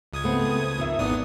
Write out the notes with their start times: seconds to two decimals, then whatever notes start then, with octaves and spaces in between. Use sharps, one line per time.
0.13 C#2 D#6 G#6
0.24 A3 B3 C4
0.78 F2 D#3 E5
0.99 G#1 E2 B3 D#4 D5 D#6